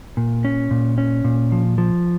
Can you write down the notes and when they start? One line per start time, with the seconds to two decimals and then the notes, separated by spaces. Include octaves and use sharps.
0.17 A#2
0.45 C#4
0.71 A#2
0.98 C#4
1.24 A#2
1.52 F3
1.78 F3